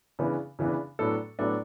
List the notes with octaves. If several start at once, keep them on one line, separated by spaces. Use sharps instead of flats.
C#3 E3 B3 D4
C#3 E3 B3 D4
A2 F#3 B3 D4 A4
A2 F#3 B3 D4 A4